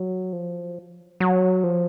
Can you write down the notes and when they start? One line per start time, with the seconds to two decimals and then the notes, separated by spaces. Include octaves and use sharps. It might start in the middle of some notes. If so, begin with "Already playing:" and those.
Already playing: F#3
0.33 F3
1.20 F#3
1.64 F3